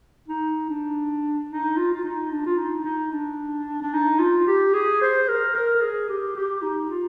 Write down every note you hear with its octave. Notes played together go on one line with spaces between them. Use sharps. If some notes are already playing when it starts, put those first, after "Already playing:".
D#4
D4
D#4
F4
F4
D#4
D4
F4
D#4
D#4
D4
D4
D#4
F4
G4
G#4
C5
A#4
A#4
A#4
G#4
G4
G4
D#4
F4